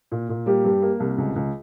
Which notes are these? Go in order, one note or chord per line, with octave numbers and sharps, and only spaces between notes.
A#2
A#2
G3 A#3 G4
G2
A#3
C2
C#2
C#2